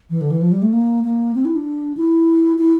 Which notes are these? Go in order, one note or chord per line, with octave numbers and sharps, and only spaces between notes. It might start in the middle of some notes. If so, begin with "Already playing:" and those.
E3
D3
E3
F3
G3
A3
A#3
A#3
C4
E4
D4
E4
E4